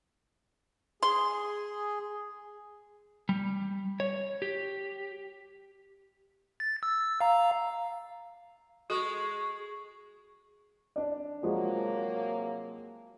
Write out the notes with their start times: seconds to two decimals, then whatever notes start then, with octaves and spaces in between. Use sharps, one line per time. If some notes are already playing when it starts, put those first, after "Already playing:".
1.03 G#4 C6
3.29 G3
4.00 C#5
4.42 G4
6.60 A6
6.83 E6
7.21 F5 A#5
8.90 G#3 F#4 A4 C#6
10.96 D4 D5
11.43 C3 F3 F#3 G#3 A#3 F#4